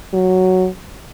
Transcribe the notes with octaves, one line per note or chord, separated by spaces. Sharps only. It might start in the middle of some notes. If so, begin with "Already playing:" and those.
F#3